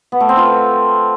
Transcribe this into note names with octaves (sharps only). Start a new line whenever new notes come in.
B3
A3
C4
F4